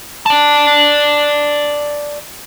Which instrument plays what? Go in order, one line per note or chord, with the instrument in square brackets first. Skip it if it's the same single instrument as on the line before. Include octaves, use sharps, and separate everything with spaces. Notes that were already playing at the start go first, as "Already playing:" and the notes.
[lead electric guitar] D5 A5